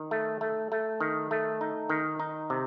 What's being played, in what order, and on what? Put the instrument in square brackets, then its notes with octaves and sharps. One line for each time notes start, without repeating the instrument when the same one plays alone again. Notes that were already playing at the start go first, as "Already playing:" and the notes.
Already playing: [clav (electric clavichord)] D#3
A3
A3
A3
D#3
A3
D#4
D#3
D#4
C3